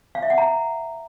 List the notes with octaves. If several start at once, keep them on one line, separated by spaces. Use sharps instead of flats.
F5
E5
F#5
A#5